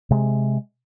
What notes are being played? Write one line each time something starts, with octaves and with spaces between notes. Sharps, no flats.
C3 G#3